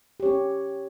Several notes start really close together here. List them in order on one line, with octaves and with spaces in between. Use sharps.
G4 C#5 C#4